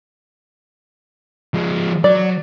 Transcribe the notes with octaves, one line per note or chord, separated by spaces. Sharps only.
F3 G#3
F#3 D5